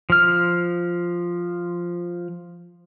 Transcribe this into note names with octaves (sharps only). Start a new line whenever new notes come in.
F3 F6